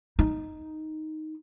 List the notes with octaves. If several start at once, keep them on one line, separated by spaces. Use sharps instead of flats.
D#4